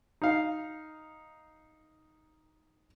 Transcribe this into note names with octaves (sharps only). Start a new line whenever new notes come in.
D#4 F5